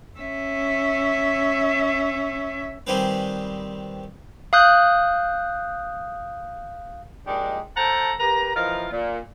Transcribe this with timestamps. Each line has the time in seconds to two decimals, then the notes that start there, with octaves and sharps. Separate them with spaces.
0.19 C#4 E5
2.87 D#3 G3 C4 G4 G#4 B4
4.53 F5 D#6 F#6 G6
7.27 F3 G#3 A#3 D4 D#4 G4
7.77 A4 C5 F#5 G5 A5 A#5
8.19 G4 A#4 B4 A#5
8.56 E3 F3 D#4 F4 A#4
8.92 A#2